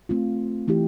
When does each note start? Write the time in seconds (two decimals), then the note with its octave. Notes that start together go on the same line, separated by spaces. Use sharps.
0.09 A3 C4 F4
0.68 E3 A3 E4 G4